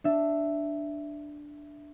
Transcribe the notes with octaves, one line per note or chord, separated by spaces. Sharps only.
D4 E5